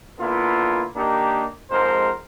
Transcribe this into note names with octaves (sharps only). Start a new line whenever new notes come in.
D3 A#3 B3 E4 F4
D#3 A#3 D4 D#4 G4
F2 G#2 G#3 A#4 C5